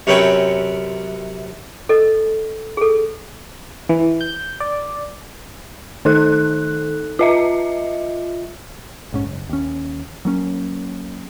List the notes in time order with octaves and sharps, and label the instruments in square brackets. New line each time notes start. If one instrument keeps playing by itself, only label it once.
[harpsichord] F#2 C3 C#4 B4 G5 C#6
[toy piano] A4 D#5
G#4 A4
[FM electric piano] E3
G6
D5
[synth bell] D#3 D#4 A4 F#6
F4 D#5 E5
[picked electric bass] B1 G#2 C#4
F#1
D#2 C#4
F#3 A#3 C#4